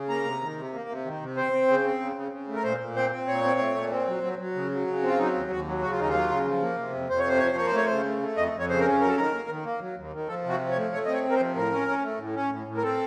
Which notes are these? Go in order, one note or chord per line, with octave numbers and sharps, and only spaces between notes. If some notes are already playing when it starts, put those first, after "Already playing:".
Already playing: C#3
A#3 A#5
C3
D#3
C3
A#3
C3
D#3
C3
C4 C5
C4
C#3
C4
C#3
C#3
C#3
A3
A#4
A#2 C5
A#2
C4 C5
C4
A#2 C#5
C4
A3
A#2
C4
F#3
F#3
F#3
C#3
F#3
C#3
C4 F4
F#3 D#4
D#2
D#2 F#4
F#3
C#3 F#4
F4
D#2 D#4
F4
F#3
C#3
F3
A#3
C3
F2
F2 C5
C#5
C3 C5
F3 C#5
C5
A#3 C#5
C5
A3 C#5
C#3 C5
A3
A3
F2 D#5
F2
C#5
C#3 C5
A#4
C#4
F#3 A#4
A4
D#3 A#4
A#3
D#3
A#3
F#3
D#2
D#3
F3 A4
C3
F#4
F3
C#5
A3
A3 C#5
C4 D#5
C#5
C3
A#4
C5
F3
A2 A#4
C#4
C#4
A3
A2
C#4
A2
A2
A#4
C4 A4